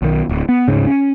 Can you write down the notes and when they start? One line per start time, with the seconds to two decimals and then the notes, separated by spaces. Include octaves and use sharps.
0.02 B1 D#3
0.29 D1
0.49 B3
0.68 D1 G#2 C#3
0.87 C#4